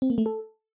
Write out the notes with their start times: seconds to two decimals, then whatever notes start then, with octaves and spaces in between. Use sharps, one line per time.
0.02 C4
0.10 A#3
0.18 A3
0.26 A4